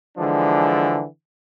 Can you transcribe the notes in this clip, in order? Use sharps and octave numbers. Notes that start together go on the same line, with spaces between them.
D3 E3 F3 G#3 D4